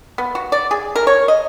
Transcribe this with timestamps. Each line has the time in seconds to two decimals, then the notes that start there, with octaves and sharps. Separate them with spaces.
0.18 B3
0.35 F#4
0.52 D5
0.71 G#4
0.96 A#4
1.07 C#5
1.28 D#5